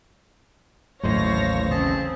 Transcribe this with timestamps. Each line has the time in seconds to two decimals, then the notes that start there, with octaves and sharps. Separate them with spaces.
1.04 A1 D#2 A2 F#3 C5 C#5 F5 A#6
1.71 C#3 C4 G#4 A5